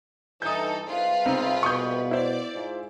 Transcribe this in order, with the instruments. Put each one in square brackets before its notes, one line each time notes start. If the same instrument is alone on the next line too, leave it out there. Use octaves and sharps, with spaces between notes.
[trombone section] G2 E3 [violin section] D#4 A4 [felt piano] D#6 G6
[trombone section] C2 G#2 [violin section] F4 B4
[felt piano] C3 C4 D#4
[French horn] B2 [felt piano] C#6 D#6 G6
[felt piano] E4 C5 [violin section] D5
[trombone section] G#2 F4